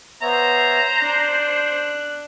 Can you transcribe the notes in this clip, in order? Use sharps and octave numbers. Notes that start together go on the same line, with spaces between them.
B3 C5 C#5 E5 A#5
D4 F#6